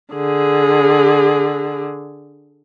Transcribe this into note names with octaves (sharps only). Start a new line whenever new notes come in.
D3 G#4